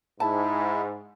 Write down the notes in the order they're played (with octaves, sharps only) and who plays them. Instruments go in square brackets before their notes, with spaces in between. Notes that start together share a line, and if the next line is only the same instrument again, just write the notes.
[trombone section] G#2 [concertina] E4 [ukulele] A5